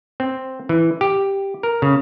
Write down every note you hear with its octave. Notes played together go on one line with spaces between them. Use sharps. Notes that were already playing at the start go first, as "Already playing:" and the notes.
C4
E3
G4
A#4
C#3